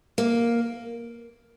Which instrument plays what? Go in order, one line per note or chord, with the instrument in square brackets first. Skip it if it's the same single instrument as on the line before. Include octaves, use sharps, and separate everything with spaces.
[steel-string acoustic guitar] A#3